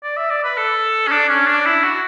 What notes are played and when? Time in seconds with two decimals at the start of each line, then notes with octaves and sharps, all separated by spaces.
0.03 D5
0.17 E5
0.30 D5
0.44 B4
0.57 A4
1.08 C#4
1.12 D4
1.29 C#4
1.48 D4
1.66 E4
1.84 F#4